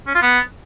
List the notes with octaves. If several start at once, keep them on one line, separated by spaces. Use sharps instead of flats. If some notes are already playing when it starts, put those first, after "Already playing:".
C#4
F4
B3